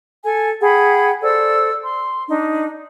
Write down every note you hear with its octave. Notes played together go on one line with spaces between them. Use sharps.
A4 G#5
G#4 F#5 G5 B5
A4 C5 D5 E6
C6
D4 D#4